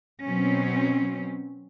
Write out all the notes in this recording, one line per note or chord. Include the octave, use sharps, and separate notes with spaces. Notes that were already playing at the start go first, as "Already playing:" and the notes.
B2 F#3 C4 C#4